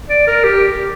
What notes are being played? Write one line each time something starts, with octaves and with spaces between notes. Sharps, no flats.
D5
A#4
G4